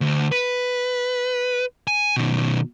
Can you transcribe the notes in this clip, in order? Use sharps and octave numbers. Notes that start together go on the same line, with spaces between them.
D2
B4
G#5
B2 D#3